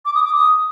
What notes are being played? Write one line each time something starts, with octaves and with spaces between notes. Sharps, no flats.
D6
D#6
D6
D#6